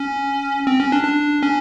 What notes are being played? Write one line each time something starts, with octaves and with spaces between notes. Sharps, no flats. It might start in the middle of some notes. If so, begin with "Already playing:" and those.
Already playing: C#4
C4
C#4
D4
D4
C#4